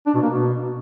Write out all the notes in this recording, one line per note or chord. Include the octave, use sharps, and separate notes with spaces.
D4
B2
A#3
B2